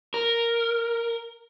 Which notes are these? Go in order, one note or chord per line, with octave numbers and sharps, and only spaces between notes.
A#4